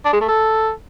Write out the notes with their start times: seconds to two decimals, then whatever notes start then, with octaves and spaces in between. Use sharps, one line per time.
0.05 D4
0.13 G#3
0.21 A3
0.29 A4